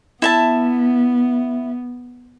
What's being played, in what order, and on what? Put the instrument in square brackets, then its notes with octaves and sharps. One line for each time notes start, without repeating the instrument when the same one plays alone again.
[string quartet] B3 [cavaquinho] E4 E5 A5